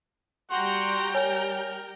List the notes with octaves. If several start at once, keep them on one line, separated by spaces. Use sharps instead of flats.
G3 F#4 F#5 G5 A#5 C6
A#4 C#5 G#5